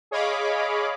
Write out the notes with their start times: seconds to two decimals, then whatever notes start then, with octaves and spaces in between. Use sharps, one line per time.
0.11 G#4 C#5 D#5 F5 B5 D6